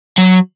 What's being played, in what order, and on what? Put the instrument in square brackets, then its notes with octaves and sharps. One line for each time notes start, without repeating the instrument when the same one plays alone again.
[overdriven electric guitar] F#3